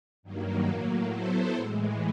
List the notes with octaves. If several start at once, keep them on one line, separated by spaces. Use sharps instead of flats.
G2 D#3 F#3 A#3
A2 F#3 A#3
F#3 B3 E4 A4 C5
A2 E3 G#3